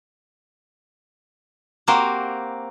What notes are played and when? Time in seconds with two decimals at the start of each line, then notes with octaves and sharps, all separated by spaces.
1.88 A#3 C4 F#4 G4 A#4 C5